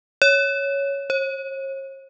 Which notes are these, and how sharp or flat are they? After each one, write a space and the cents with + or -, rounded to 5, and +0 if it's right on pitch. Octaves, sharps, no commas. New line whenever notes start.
C#5 +5
C#5 -45